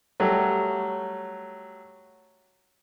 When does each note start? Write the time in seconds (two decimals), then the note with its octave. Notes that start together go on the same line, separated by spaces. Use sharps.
0.20 F#3 G3 A3